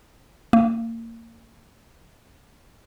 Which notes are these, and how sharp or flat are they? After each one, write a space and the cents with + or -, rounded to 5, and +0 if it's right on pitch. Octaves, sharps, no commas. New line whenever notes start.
A#3 -30